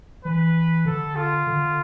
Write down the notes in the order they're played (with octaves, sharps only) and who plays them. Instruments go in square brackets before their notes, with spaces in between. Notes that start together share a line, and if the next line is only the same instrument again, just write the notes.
[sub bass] E3 [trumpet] B4
[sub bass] D3 [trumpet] A4
[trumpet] F4
[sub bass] D3